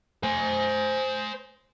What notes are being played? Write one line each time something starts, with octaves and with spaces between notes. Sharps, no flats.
C5 G#5